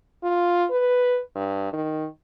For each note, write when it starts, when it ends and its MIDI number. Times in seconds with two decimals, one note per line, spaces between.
0.23 0.65 65
0.71 1.20 71
1.35 1.70 43
1.73 2.06 51